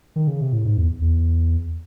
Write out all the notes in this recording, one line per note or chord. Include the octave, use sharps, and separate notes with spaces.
D#3
C#3
C3
A2
G#2
E2
E2